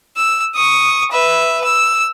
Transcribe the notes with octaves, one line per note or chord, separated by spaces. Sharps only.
E6
C#6 D#6
B4 E5
E6